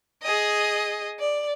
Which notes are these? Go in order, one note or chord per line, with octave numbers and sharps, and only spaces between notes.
G#4 D#5
D5